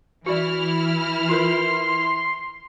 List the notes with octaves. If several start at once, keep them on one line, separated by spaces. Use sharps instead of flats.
E3 E4 F#4 D5 F6
F4 A#4 B4 C6